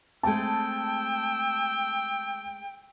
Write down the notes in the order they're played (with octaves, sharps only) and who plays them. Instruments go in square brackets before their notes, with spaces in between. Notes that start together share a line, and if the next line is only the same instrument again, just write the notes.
[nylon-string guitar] G#3 A3 C4 [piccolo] G5 [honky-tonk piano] A5 [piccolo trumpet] E6